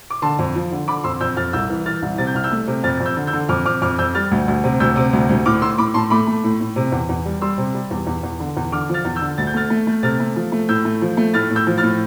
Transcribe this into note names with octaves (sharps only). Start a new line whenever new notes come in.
D6
D3 A5 C6
F2
F3
D3
D3 B5 D6
F2 C6 E6
F2 E6 G6
F2 F6 A6
C2 E6 G6
E3
E3 F6 A6
C2
C3 A6
G6
C2 F6
E6 G6
A3
C3
F2 F6 A6
F2
E6 G6
D3
E6 G6
D3
F2 D6 F6
F2 D6 F6
F2 D6 F6
F2 E6 G6
G3 F6 A6
D2
D2
C3
D2 E6 G6
C3
D2
D2
A2 D6 F6
A2 C6 E6
A2 B5 D6
A2 A5 C6
A3 B5 D6
A3
A2
A2
C3
E2
E2
G3
G3 C6 E6
C3
G3
E2
E2
E2
D3
E2
D3 D6 F6
F3
F6 A6
E2
E6 G6
D3
D2 A6
G6
A3 F6 A6
A3
A3
C3 F6 A6
A3
F3
A3
A2 E6 G6
A3
F3
A3
A2 F6 A6
A2
E6 G6
F3
F6 A6
A2